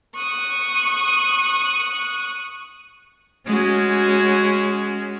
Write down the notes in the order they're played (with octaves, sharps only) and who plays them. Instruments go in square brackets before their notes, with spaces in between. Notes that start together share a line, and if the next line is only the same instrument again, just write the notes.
[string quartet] C#6 D#6 F#6
[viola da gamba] G#3 C#4 F#4